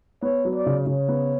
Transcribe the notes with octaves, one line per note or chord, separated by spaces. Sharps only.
B3 C#5
F#3
D5
C#3
C#3 C#5
B3